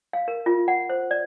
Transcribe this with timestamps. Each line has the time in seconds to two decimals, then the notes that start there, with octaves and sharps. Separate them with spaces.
0.13 F5
0.28 A#4
0.46 F4
0.68 F#5
0.90 C5
1.11 D5